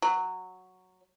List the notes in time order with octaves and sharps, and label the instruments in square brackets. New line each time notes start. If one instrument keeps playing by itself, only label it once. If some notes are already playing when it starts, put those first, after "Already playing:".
[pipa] F#3